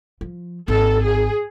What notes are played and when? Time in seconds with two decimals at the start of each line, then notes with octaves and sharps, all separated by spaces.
0.21 F3
0.68 G#1 A4
1.03 G#4